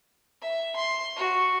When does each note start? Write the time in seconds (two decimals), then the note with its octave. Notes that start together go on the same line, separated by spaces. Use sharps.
0.42 E5
0.76 C6
1.17 F#4